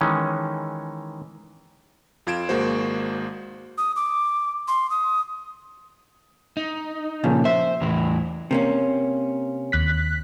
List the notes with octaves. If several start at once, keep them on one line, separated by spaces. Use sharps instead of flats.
D#3 E3 G#3 C#4
F2 F4 G#6 D7 E7
G#1 G#3 A#3 F#4 C5
D#6
D6
C6
D#6
D#4
A#2 C#3 F3
C5 E5
E2 A2 E3
C3 A#3 C#4
D#2 F#6 B6